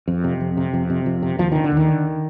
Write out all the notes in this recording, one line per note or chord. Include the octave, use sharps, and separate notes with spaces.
F2
C3
F2
C3
F2
C3
F2
C3
D#2 F3
D3 D#3
D3
D#2
D#3
D3